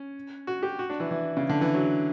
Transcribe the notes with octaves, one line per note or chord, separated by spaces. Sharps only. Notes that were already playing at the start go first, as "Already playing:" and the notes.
Already playing: C#4
F#4
G4
F#4
D4
E3
E3
C#3
D3
E3
F#3